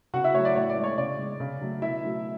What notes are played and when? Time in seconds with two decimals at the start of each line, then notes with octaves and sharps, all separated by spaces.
0.14 C#3 F#4 F#5
0.24 E4 E5
0.34 A3 C#5
0.39 F#3
0.45 D5
0.56 A2 C#5
0.69 D5
0.77 G#3
0.84 C#5
0.98 C#3 D5
1.19 G#3
1.40 C#3
1.61 F#3 A3
1.82 B2 E4 E5
2.03 F#3 A3